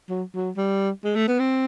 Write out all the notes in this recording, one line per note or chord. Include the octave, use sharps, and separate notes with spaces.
F#3
F#3
G3
G#3
A3
B3
C4